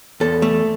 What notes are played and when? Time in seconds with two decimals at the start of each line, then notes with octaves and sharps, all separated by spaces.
0.20 E2 A4
0.42 A3